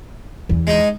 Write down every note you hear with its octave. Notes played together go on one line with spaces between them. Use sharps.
E2 E3
G#3 D#4